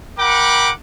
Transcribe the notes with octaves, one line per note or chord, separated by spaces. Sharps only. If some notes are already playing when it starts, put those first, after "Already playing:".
A#4 F#5 G5 B5 D6